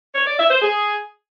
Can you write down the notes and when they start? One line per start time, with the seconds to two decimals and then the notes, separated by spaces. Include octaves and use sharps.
0.15 C#5
0.27 D5
0.39 E5
0.50 C5
0.62 G#4